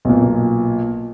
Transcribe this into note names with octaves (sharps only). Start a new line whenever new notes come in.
B1 A#2